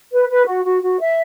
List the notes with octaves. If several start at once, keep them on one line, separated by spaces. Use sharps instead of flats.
B4
B4
F#4
F#4
F#4
E5